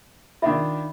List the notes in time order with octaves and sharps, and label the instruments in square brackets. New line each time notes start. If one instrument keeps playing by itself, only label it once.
[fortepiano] D#3 D4 F4 [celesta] E5 B5